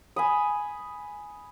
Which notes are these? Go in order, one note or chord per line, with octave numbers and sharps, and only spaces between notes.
G#5 B5 D#6